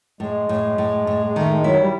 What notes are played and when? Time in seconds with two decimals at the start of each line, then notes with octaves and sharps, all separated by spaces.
0.20 A2 G#3
0.49 A2
0.78 A2
1.07 A2
1.26 G#3
1.36 D#3 A3
1.50 G#3
1.64 F#3 E4
1.79 G3